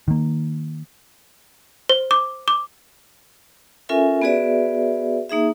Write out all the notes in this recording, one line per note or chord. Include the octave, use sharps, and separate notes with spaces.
D#3 A#3
C5
D6
D6
C#4 F4 A4 A#4 E5 G#5
B3 F#4 G#4 B4 D5 E5
A#3 D#4 G#4 E5